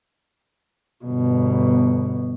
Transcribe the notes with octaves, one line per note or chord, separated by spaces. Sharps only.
G1 B2